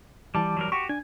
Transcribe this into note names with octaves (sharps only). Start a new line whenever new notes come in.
E3 G3 A5 D6
F#3 G3 A#4
F#4 G4 C#6
D4 G#5